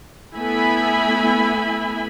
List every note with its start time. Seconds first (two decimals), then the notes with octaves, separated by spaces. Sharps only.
0.37 A3 B3 E4 E5 G#5 B5